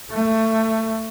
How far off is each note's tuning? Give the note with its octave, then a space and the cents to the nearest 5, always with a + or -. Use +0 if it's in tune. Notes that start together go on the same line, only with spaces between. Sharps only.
A3 +20